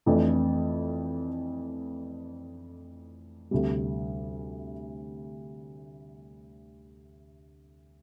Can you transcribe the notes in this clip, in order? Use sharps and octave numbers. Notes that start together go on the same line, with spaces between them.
F2 E3 A3 D4
D2 C3 G3